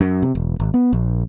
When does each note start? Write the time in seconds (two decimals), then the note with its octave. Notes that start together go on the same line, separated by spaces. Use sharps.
0.01 F#2
0.22 C3
0.35 E1
0.60 G#1
0.74 B3
0.93 A#1